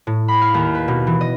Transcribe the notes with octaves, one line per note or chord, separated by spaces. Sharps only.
A2
B5
F5
D#2
B4
B2
E3
D#5